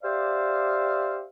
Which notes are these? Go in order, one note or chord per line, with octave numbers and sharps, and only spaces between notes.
G4 C5 D5 E5 F5